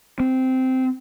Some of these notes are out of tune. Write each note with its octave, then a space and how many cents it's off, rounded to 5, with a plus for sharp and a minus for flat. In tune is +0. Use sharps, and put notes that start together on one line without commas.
C4 -10